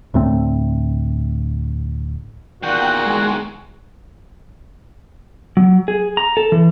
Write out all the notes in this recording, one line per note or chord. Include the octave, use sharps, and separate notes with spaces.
D2 A2 A3 C4
E2 A#2 D#3 F#4 F#5 G5
G#3
F#3
G#4
A#5
A4
E3